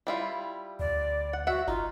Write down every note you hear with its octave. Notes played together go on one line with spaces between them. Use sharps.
G3 E4 F4
D2 D5
F#5
F#4 E5 F#5
G1 D#4 F4